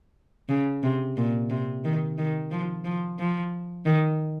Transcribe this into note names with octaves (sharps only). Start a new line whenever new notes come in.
C#3
C3
A#2
C3
D#3
D#3
F3
F3
F3
D#3